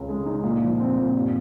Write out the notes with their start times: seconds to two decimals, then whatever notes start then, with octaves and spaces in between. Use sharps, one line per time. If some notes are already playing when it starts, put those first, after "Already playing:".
Already playing: C#2 C#3
0.09 G#3
0.26 D#4
0.43 A#2
0.62 F3
0.80 C4
0.97 A#2
1.15 G2